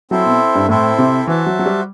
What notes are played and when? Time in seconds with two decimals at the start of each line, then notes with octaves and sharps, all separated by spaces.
0.11 F#3 C4 E4 A4 C5 E5
0.26 B2
0.55 G2
0.69 A2 C4 E4 A4 C5 E5
0.99 C3
1.27 E3 F#4 C5 E5 A5
1.46 F#3
1.59 F#3
1.66 G3